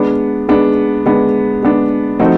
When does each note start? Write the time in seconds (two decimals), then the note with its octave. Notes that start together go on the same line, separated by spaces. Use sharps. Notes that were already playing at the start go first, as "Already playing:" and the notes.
Already playing: G#3 B3 D4
0.49 G#3 B3 D4
1.06 G#3 B3 D4
1.63 G#3 B3 D4
2.19 F3 A3 C4 D#4 F#4